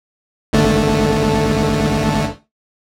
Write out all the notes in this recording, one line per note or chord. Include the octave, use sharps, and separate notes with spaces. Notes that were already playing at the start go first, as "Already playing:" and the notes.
G#1 D3 A3